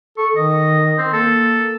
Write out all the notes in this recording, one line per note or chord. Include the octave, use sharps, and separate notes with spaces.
A4 C#6
D#3 D#5
C4
A#3 A4